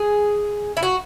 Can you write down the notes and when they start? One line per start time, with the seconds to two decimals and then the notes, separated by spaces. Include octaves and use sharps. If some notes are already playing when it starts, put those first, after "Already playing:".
Already playing: G#4
0.77 E4
0.83 F#4